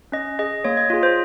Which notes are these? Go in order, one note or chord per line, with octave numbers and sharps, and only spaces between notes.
C#4 D#5
G#4 D#5
A#3 C#5
D#5
F4 G#4 D#5
C5